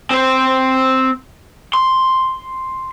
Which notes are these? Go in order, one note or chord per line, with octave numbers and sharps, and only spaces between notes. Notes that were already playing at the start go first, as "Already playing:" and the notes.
C4 C5
C6